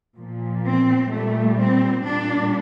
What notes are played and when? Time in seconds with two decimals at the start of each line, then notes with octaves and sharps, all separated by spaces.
0.18 A#2 F3
0.65 C4
1.11 A#2 G3 A3
1.58 C4
2.05 A#2 G3 D4